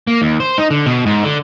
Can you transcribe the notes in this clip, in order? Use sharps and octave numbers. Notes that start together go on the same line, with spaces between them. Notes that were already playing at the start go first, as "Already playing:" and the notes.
A#3
D#2
C5
D#4
D3
B2
G#2
D3